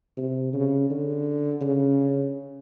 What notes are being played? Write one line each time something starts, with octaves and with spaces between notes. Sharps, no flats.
C3
C#3
D3
C#3